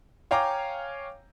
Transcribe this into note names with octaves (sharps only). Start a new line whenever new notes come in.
C#5 F5 G5 G#5 A#5 D6